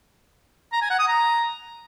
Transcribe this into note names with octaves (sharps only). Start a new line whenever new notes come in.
A#5
G#5
F#5
D#6
A#5